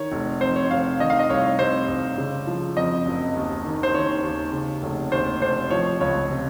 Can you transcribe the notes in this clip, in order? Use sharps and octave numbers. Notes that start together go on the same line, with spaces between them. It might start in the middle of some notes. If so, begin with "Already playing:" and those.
Already playing: D#3 C#5
F1
F2 C5
C#5
F1 F5
D#3 D#5
F5
D#5
C2 C#5
C3 C5
C2
C#3
F3
F2 D#5
F#1
D#2
D#3
C5
D#3 C#5
D#2
C#3
F1
D#2 C5
F1 C5
F3 C#5
C#2 C#5
C3